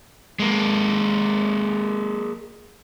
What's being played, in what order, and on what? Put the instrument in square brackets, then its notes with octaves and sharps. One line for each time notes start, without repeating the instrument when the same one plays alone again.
[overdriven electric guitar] G#3 A#3